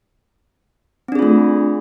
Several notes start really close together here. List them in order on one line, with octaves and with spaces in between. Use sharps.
C4 D4 G#4 F4 A3